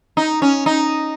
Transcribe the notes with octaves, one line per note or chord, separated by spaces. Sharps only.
D#4
C#4
D#4